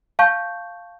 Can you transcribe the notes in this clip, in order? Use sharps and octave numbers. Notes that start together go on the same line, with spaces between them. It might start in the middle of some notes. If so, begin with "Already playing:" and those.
F5 A5 C#6 G6